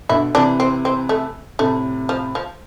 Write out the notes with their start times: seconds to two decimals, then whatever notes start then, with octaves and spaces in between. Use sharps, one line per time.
0.09 B2 D3 E4
0.35 C3 E3 D4
0.60 C4
0.85 C4
1.09 A3
1.59 A2 C3 A3
2.09 F3
2.35 F3